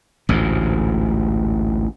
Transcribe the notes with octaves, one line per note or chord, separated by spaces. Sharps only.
A1 D2 G#2